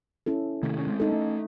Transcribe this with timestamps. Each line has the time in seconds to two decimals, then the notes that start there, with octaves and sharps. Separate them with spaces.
0.26 C#4 E4 A4
0.63 C3 D#3 A3
0.79 C#4
0.87 G#3 C4
1.00 D#4 A4
1.11 A3 C#4